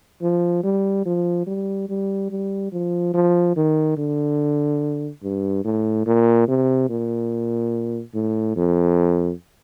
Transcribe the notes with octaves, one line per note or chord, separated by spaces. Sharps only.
F3
G3
F3
G3
G3
G3
F3
F3
D#3
D3
G2
A2
A#2
C3
A#2
A2
F2